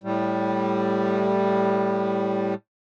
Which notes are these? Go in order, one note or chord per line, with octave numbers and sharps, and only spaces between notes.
A2 G3